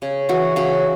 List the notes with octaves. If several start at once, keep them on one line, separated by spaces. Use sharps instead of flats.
C#3
E3 F#4
C#3 F#4